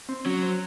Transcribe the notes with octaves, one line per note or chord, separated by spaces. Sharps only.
C4
F#3 C#4
C4